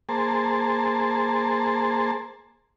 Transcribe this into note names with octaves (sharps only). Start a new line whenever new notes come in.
A#3 G#4 C5 A5